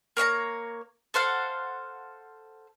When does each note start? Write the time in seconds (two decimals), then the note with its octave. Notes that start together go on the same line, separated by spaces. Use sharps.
0.17 A#3 C#5 G5 A#5
1.14 A4 C5 F5 F#5